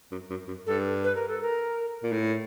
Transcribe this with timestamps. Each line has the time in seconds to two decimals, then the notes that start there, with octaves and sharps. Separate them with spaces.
0.12 F#2
0.30 F#2
0.48 F#2
0.66 G2 A4
1.03 B4
1.15 A#4
1.28 A4
1.41 A#4
2.03 A#2
2.12 A2